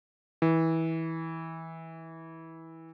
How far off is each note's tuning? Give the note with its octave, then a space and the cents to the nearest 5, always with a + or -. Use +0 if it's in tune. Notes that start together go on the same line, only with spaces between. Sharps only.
E3 -20